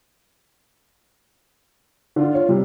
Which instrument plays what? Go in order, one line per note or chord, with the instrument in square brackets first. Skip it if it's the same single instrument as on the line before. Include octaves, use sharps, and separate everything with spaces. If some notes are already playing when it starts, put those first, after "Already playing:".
[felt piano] D3 [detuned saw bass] F4
[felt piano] C#5
[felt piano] C3 [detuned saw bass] G3